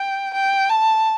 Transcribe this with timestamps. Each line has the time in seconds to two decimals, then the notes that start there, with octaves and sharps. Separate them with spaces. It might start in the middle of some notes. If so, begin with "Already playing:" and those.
Already playing: G5
0.34 G5
0.70 A5